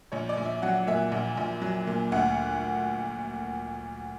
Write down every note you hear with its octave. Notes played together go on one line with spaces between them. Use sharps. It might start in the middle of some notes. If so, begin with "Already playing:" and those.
A#1 C#5
D5
A#1
E5
F#3 F#5
A#2 E5
A#1
A#1
F#3
A#2
D2 F#5